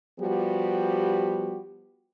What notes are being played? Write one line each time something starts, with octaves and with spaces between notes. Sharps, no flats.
F3 G3 B3 F#4 G4